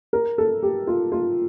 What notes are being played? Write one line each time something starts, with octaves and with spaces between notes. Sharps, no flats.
A#4
A4
G4
F4
F4